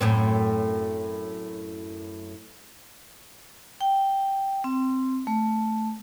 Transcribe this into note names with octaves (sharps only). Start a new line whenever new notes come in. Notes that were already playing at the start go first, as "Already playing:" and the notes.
F#2 A2 C4
G5
C4
A3